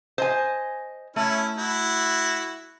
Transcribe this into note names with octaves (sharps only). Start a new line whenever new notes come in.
C5 D#5 G#5
A3 C#4 E4
E4 F#4